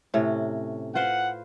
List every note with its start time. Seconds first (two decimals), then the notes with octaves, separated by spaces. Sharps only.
0.14 A2 C3 C#4
0.95 F4 B4 C5 F#5